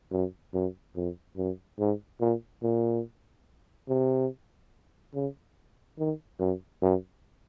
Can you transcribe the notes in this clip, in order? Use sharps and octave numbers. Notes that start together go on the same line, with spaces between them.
F#2
F#2
F2
F#2
G#2
A#2
A#2
C3
C#3
D#3
F#2
F#2